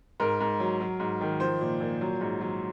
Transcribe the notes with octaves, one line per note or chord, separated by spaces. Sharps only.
G#2 A#4
G#2
F#3
F#3
G#2
D#3
F3 C5
A#2
A#2
F#3
G#2
F#3